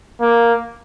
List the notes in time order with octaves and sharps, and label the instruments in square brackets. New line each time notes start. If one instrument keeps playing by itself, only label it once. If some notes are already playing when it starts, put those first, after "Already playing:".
[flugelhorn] A#3